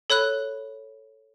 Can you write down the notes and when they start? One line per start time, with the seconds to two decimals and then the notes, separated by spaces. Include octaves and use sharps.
0.10 A4 C#5 B5 F#6